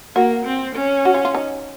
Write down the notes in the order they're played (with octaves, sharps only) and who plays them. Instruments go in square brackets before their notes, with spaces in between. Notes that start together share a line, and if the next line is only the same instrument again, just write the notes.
[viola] A#3 [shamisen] F#4
[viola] C4
C#4
[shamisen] F#4
F4
F4
D#4